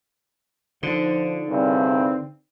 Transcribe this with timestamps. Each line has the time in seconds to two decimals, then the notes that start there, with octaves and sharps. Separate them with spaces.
0.83 D3 F3 D#4
1.48 C2 G2 C#3 C4